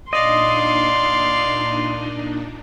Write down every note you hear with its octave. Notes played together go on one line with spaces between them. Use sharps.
A#2 D4 D#4 D5 D#5 F5 C6